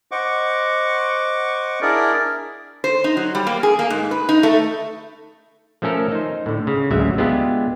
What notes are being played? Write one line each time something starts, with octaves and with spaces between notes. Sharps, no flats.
C5 D#5 F#5 C#6 D6
D4 E4 G#4 A#4 D5
C5
D#4
F#3
G3
A#3
G#4
A#3
G#2
B4
D#4
A3
F3 A3 C#4 A4 A#4
D#4 C5
A2 D3
C#3
A1 D2 C#3 F#3 G#3 E5
G#3 B3 D4 F4 G4 E5